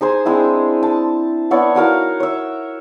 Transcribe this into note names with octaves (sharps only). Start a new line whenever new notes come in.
D#4 G#4 C5 G#5
G#3 C4 D4 E4
A5
B3 E4 C#5 D5
D#4 F#4 A#4 F5
C#5 E5